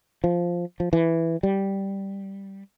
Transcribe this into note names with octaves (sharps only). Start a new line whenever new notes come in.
F3
F3
E3
G3